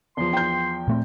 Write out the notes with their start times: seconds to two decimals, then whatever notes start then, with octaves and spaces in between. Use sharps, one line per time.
0.17 E2 F3 C6
0.33 G5 G6
0.88 A#2 A3 C4